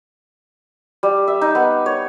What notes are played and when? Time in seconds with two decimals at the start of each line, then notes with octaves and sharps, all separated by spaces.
1.03 G3
1.28 E5
1.41 D#4
1.55 B3
1.86 C#5